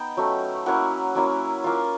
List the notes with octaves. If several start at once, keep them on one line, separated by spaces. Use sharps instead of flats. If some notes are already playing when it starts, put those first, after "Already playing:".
Already playing: B3 D#4 G5
F#3 A3 C#4
F#3 A#3 C#4 E4 F#5
F#3 A#3 C#4 E4
A#3 C#4 F4 F5